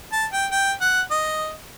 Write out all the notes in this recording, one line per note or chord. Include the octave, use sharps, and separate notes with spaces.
A5
G5
G5
F#5
D#5